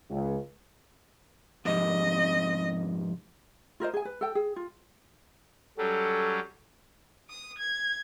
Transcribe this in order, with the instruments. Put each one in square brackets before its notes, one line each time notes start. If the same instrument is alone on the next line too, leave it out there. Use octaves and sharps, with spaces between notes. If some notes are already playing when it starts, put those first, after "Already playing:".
[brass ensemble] C#2
[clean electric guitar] F2 G#2 C3 [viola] D#5
[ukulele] F4 A#4 C5 D#5
G#4 G#5
B4
A4 G5
G#4
F4
[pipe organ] F#3 G3 C#4 [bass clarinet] A4
[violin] D#6
G#6